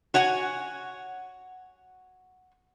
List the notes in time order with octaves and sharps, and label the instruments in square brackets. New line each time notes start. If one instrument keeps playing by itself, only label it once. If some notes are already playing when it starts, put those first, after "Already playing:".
[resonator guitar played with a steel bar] F#4 C#5 F#5 G#5